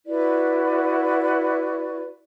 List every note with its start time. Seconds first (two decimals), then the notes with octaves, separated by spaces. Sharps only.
0.06 E4 F#4 B4 D5